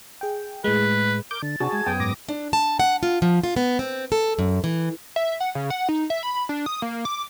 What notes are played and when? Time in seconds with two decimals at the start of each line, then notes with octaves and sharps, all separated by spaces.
0.21 G#4 G5
0.64 A2 G#3 B4
1.31 A#4 D6 G6
1.43 D3 A6
1.60 C3 D4 F#4 G#4 A5
1.72 G#3 G#6
1.87 F#2 B3 G5 D#6
2.00 G#2 D6 A#6
2.28 D4
2.53 A5
2.80 F#5
3.03 F4
3.22 F3
3.44 F4
3.57 B3
3.79 C4
4.12 A4
4.39 F#2
4.64 E3
5.16 E5
5.40 F#5
5.55 C#3
5.70 F#5
5.89 D#4
6.10 E5
6.23 B5
6.49 D4
6.66 D#6
6.82 A#3
7.05 D6